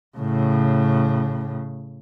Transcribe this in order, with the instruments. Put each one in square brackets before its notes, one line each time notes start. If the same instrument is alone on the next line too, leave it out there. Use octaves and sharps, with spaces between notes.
[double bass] A2 C#3